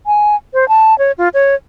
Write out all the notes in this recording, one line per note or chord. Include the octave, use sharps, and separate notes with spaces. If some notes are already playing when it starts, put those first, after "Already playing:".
G#5
C5
A5
C#5
F4
C#5